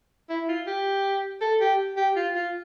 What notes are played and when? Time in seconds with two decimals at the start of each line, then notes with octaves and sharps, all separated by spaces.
0.30 E4
0.48 F4
0.67 G4
1.41 A4
1.61 G4
1.97 G4
2.16 F4
2.35 F4